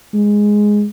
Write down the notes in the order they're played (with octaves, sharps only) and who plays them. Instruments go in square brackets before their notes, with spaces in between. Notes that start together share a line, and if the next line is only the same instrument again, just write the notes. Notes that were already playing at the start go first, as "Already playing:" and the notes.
[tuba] G#3